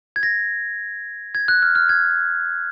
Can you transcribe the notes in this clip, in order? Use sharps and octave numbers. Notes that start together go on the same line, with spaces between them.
G#6
A#6
G#6
F#6
F6
F6
G#6